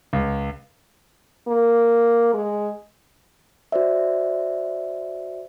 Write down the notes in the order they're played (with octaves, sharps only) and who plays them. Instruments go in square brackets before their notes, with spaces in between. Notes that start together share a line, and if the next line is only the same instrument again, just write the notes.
[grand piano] C#2
[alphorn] A#3
G#3
[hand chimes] F#4 C5 D5 E5